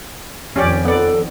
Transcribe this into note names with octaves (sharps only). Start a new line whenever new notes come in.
F2 D#3 C#4 G4 D5
B3 A4 D5